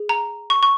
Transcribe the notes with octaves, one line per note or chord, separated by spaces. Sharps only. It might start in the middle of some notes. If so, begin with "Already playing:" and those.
Already playing: G#4
A#5
C#6
C#6